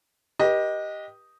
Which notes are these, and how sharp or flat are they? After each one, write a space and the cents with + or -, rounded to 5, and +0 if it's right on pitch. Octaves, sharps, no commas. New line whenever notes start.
G4 +0 B4 -35 D#5 +0